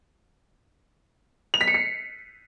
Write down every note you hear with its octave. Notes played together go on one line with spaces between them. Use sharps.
F7
B6
C#7
C7